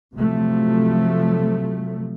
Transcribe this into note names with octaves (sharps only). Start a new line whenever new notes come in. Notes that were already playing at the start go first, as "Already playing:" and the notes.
C3 F3 F#3 A3